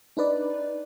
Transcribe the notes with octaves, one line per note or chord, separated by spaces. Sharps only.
D4 D#4 B4 D5